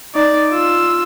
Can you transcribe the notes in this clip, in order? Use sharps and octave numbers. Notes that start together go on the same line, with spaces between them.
D#4 D5
F4 E6